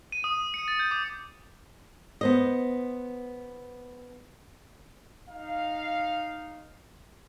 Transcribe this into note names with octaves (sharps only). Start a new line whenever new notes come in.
D#7
D#6
C#7
A6
G6
D6
B3 C5 D#5
D#4 F5